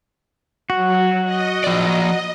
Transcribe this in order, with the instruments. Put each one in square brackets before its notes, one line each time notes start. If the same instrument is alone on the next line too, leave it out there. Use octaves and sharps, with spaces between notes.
[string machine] F#3 [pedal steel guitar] F#4
[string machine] D#5
[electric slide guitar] F3 D5